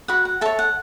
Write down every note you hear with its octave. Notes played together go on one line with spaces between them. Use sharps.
F#4 F#5 B5
F#5
A4 C#5 E5 A5
F#5